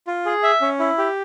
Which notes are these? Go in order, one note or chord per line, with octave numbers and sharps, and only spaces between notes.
F4
G#4
E5
C#4
E4
G4